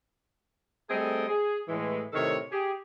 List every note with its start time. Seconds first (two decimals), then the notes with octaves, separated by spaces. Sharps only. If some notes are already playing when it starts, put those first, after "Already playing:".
0.89 G3 A3 C4 G#4 A4 D#5
1.28 G#4
1.68 A2 E3 G#3
2.13 A2 C3 D#3 A4 C#5
2.51 G4 G#4